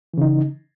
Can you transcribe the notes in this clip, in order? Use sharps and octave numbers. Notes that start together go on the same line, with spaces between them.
C#3 E3 D#4